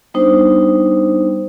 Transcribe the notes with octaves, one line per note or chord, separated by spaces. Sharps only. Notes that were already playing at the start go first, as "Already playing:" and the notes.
G3 B3 D4 D#4 C5